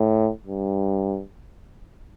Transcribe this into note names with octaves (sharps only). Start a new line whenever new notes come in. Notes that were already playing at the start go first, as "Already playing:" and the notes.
Already playing: A2
G2